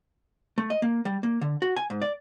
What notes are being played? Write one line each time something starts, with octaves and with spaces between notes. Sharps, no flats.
A3
D#5
A#3
G3
A#3
D3
F#4
G#5
G#2
D5